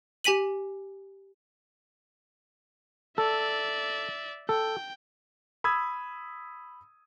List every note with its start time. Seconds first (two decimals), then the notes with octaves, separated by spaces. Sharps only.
0.24 G4 G#5 B6 D#7 F#7
3.18 A4 D5 E5
4.49 A4 G5
5.64 B5 D#6 E6 G#6